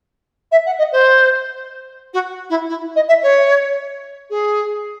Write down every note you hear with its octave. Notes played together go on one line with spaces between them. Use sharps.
E5
F#5
D#5
C5
F#4
E4
E4
D#5
E5
C#5
G#4